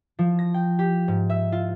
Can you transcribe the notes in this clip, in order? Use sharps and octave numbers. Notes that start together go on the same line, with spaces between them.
F3
A#6
G5
G4
G#2
E5
F4